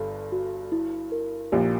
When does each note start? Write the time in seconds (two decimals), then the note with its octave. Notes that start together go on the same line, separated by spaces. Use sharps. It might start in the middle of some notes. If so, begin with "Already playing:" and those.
Already playing: G1 G2 A4
0.32 F#4
0.72 E4
1.12 A#4
1.52 A#1 A#2 G4